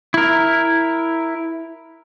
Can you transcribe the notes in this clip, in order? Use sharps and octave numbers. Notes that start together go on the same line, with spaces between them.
E4 A#4